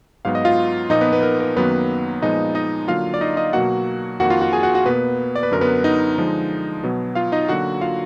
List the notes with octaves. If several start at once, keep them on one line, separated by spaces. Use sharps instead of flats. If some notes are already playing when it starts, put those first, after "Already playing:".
G#2 F#3 B3 F5
D#5
F4 F5
A#2 F3 A#3 D#4 D#5
B3 B4
B3 B4
A#4
A#4
F#2 D#3 F#3 A#3 B3 B4
A#2 F3 G#3 B3 D#4 D#5
D#4 D#5
D3 F#3 A#3 F4 F5
D5
D#4 D#5
D#4 D#5
B2 F#3 A#3 F#4 F#5
F2 D#3 A#3 F#4 F#5
F4 F5
F#4 F#5
G#4 G#5
F#4 F#5
F#4 F#5
B2 A#3 B3 B4
D5
B4
F#2 D3 F#3 A#4
B3 B4
D#4 D#5
D3 F3 G#3
B2 F#3 B3
F4 F5
D#4 D#5
D3 F#3 A#3 F#4 F#5
F4 F5